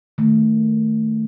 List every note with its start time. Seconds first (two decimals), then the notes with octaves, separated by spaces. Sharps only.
0.18 D#3 A3